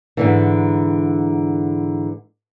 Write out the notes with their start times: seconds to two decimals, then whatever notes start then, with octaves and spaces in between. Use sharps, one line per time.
0.17 G#2 D3 E3